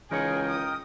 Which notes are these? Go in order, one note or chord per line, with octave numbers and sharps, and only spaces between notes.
C#2 E3 D#4 G#4 A#4 C#5 D#5 G5
D#6